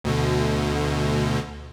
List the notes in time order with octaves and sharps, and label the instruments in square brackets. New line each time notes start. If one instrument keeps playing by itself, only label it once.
[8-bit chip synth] D2 B2 D3